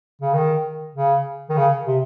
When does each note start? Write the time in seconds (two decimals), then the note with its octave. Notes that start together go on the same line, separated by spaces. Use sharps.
0.22 C#3
0.34 D#3
0.95 C#3
1.49 D#3
1.57 C#3
1.87 C3